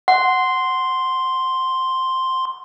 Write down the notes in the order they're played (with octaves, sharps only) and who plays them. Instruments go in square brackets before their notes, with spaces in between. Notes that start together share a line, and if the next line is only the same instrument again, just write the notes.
[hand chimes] F#5 [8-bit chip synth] C6